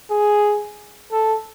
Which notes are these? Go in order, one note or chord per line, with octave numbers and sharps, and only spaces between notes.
G#4
A4